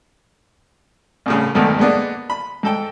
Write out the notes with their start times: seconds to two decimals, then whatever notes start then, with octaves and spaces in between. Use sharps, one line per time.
1.26 C2 A2 C#3
1.55 B1 E2 G#2 D3 D#3 A3
1.78 D3 G#3 A#3 B3 D4
2.30 B5
2.63 G#2 A4 G5